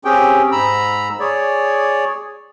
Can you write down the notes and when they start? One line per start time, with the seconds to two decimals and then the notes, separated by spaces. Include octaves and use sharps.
0.05 C4 C#4 G4 G#4 G5
0.52 G#2 A#5 B5 E6
1.20 G#4 C#5 D5